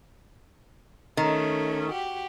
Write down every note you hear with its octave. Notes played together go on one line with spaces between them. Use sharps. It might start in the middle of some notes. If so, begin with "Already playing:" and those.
D#3 A3 C#4
F#4 G4